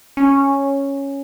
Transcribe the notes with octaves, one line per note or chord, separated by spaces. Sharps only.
C#4